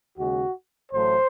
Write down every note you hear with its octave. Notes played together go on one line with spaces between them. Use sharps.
D#2 C#3 G#3 F#4
A1 A2 F#3 A3 C5